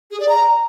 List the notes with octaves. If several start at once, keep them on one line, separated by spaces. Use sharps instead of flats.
G#4
D5
A#5